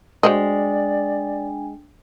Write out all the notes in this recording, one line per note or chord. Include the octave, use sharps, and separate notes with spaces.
G#3 D4 F#4 C5 D5 D#5 G5 G#5